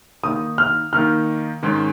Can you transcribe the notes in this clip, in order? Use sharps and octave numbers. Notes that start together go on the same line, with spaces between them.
D#3 A#3 D#4 D#6
F6
D#3 A#3 D#4 F6
G#2 D#3 G#3 C#4